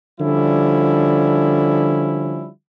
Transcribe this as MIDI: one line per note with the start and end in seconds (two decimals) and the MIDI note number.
0.20 2.48 50
0.20 2.48 53
0.20 2.48 55
0.20 2.48 61
0.20 2.48 64